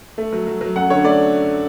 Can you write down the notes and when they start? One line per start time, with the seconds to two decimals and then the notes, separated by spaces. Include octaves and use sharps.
0.18 A3
0.33 F#3
0.47 F#3
0.61 F#3
0.76 F#2 F#5
0.90 D3 C#5
1.04 A3 D5